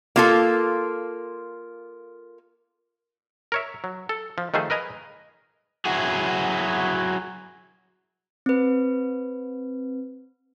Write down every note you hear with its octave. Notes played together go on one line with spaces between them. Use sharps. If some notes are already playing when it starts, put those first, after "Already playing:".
A#3 F4 A4
A#4 C#5 E5
F#3
A4
F3
D#3 F3 A3 G#4 C5
A#4 B4 D#5 G#5 A#5
F#3 E4 F#4 G#4
C4 B4